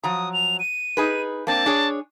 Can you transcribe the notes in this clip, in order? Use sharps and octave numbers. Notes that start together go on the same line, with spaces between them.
F3 F#3 A#5 D#6
F7
D#7
D#4 G#4 B4
A#3 C4 D4 A5
D4 G#4 C#5